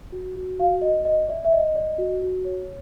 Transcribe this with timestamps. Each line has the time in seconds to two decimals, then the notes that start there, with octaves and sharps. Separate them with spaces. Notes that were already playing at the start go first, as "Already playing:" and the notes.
0.12 F#4
0.36 F#4
0.59 F#4 F5
0.82 F#4 D#5
1.05 D5 D#5
1.28 D5 E5
1.45 E5
1.52 D5 D#5
1.75 D5
1.98 F#4
2.22 F#4
2.45 C#5